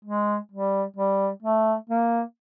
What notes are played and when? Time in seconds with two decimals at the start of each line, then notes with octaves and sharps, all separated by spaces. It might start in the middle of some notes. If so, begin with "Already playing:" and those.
0.05 G#3
0.52 G3
0.96 G3
1.42 A3
1.89 A#3